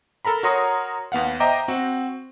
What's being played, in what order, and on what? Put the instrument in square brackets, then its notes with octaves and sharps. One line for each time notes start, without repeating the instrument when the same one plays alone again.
[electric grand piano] A4 A#4 A#5 B5
F#4 A#4 C#5 A#5 C6 D#6
D#2 B3 F5 F#5
C5 D#5 E5 G5 A#5 D6
C4 F#4